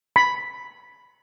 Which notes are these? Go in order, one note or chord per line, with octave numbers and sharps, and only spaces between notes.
B5